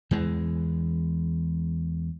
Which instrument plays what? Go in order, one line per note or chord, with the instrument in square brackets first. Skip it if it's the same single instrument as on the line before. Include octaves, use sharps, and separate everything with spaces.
[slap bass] E2 E3 G#3